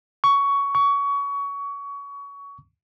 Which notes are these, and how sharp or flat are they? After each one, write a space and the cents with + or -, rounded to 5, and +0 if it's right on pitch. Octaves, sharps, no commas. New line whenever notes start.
C#6 +15
C#6 +25